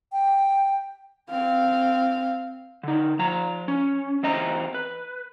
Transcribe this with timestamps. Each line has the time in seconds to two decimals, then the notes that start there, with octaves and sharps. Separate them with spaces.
0.12 G5
1.30 C4 F5
2.83 D3 D#4
3.19 F3 A#5
3.68 C#4
4.23 E2 C4 D#5 A#5
4.74 B4